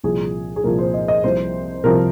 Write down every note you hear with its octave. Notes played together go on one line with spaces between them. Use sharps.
C2 A#2 F3 G#4
G#4
C2 A#2 F3 A#4
C5
D#5
D#5
C2 C3 F3 C5
C2 C3 F3 A#4